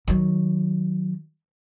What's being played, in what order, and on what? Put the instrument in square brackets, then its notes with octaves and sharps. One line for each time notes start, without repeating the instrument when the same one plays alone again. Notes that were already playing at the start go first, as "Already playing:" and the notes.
[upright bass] D#3 F#3